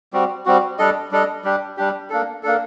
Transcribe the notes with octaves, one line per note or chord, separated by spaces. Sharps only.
G3 C4 F#4
G3 C4 F#4
G3 D4 A4 D#5
G3 D4 A4 D#5
G3 D4 G4
G3 D4 G4
A#3 D4 A4
A#3 D4 A4